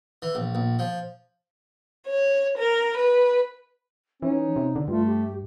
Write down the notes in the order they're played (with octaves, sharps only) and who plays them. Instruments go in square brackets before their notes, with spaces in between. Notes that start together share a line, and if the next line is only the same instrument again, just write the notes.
[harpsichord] E3
A#1
A#1
F3
[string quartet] C#5
A#4
B4
[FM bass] E3 [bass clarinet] C#4 [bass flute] D#4
[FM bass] C3
D3
[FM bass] G2 [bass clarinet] A3 [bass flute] F4
[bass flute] G4